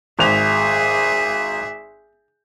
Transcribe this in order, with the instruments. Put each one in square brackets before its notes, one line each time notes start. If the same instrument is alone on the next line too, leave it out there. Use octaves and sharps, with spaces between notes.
[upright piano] G#1 F7 [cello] G#4 E5